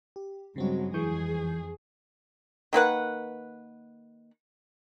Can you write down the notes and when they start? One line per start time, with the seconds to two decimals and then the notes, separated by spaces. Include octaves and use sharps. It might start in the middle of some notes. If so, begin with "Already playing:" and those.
0.16 G4
0.56 G2 C#3 F#3 G#3 C4 F#4
0.94 F2 E3 G#4 C#6 G6
2.73 D#3 A#3 B4 F#5